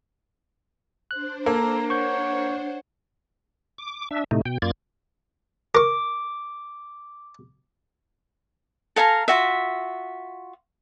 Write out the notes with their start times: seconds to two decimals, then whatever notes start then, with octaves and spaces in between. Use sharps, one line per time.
1.11 D4 C5 F#6
1.46 A#3 A4 A#5
1.90 C#5 F#5 C#6 G6
3.78 D6
4.11 D4 E5
4.31 A2 C3 A3 D#4
4.45 B2 G5
4.62 F#2 A#3 F4 D5 G#6 A6
5.75 A#4 C#6 D6
8.96 A4 F5 G#5 A#5
9.28 F4 F#4 E5